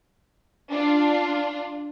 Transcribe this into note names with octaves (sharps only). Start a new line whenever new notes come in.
D4 F4